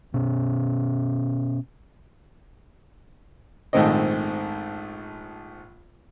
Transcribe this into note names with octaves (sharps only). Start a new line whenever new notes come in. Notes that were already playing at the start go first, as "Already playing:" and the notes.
B2 C#4
A#1 G#2 D#3 A3 C4 D#5